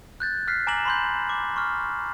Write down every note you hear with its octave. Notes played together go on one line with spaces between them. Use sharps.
F#6 G6 A6
F6 F#6 B6 C7
G#5 A#5 D6 A#6 E7 F#7
B5 C6 G6
D6
C#6 F6